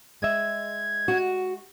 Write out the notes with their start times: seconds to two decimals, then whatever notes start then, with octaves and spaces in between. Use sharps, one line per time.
0.22 G#3 D#5 E5 G#6
1.08 F#4